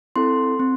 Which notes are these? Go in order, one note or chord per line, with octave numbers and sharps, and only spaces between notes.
C4 E4 A4 C6
C4